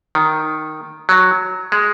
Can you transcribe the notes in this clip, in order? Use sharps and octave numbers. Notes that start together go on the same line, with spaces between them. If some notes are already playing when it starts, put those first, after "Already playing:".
D#3
F#3
G#3